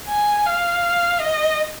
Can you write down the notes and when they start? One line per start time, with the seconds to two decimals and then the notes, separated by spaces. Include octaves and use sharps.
0.08 G#5
0.47 F5
1.20 D#5